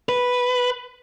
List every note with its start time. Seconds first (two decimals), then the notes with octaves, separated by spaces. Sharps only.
0.09 B4